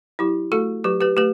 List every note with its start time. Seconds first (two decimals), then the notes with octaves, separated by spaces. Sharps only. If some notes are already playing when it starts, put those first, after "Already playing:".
0.19 F#3 E4 G4
0.52 A3 F#4 A4
0.84 F#3 G4 B4
1.01 G4 B4
1.17 A3 G4 B4